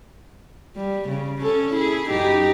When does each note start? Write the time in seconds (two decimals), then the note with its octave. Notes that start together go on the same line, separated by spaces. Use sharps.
0.76 G3
1.09 C#3
1.42 C#4 A4
1.74 E4 G#4
2.09 F#2 D#4 G4